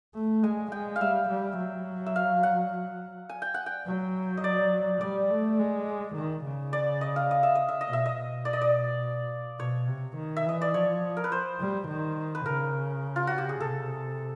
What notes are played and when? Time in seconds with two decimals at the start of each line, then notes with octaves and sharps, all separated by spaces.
0.15 A3
0.43 G#3 G#5
0.72 G#3 G5
0.96 F5
1.01 G3 E5
1.30 G3
1.57 F#3
2.06 E5
2.16 F5
2.43 F#5
3.29 G#5
3.42 G5
3.54 F#5
3.66 G5
3.87 F#3
4.37 D#5
4.44 D5
5.01 G3 D5
5.30 A3
5.59 G#3
6.15 D#3
6.45 C#3
6.73 D5
7.01 D#5
7.16 F5
7.31 D#5
7.43 E5
7.55 D#5
7.69 E5
7.81 D#5
7.88 B2
7.93 E5
8.06 D#5
8.16 B2
8.45 D5
8.53 D#5
8.61 D5
9.59 B2 C#5
9.88 C3
10.17 D#3
10.37 E5
10.46 E3 D#5
10.61 D5
10.74 F3 C#5
11.17 A#4
11.24 B4
11.32 C5
11.60 G3
11.88 D#3
12.35 B4
12.46 C#3 A#4
13.16 F4
13.27 F#4
13.38 G4
13.49 G#4
13.60 C3 A4